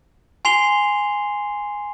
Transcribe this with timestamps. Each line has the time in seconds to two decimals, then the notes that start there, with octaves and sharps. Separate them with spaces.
0.45 G#5 C6 C7 F7 G7